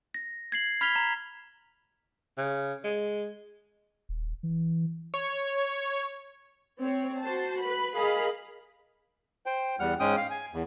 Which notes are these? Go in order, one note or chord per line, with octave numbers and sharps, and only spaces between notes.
A#6
G#6 C7 F#7
B5 F6 G#6 B6 F7 G7
A#5
C#3
G#3
D#1
E3
C#5
C4 C#5
F#4 C5 A5
B4 B5
G#4 A#4 D#5 F5 B5
C5 G5
E2 G3 F#5 F6
G#2 G#3 C#4 G5 D#6
F5
G#5
E2